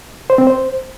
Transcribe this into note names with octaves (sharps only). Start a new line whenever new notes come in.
C5
C4
C5